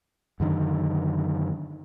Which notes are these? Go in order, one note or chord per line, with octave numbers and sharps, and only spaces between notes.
F#2 D3 D#3